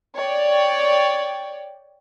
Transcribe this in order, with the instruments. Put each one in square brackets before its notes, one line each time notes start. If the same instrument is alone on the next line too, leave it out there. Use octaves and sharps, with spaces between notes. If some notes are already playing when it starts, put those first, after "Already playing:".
[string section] C#5 D5 G5